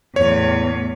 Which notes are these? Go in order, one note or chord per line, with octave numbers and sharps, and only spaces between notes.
E2 A2 C#5